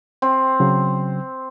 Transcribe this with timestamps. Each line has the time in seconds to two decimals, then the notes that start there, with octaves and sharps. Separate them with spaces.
0.22 C4
0.60 C#3 F#3